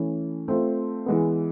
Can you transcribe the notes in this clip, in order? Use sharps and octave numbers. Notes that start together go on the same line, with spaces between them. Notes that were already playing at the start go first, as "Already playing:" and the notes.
Already playing: E3 A3 C#4
A3 C4 F4
E3 G#3 B3